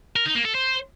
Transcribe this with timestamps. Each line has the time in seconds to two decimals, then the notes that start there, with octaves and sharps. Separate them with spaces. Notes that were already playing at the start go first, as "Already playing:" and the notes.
0.16 A#4
0.26 D#4
0.35 A#3
0.45 A4
0.55 C5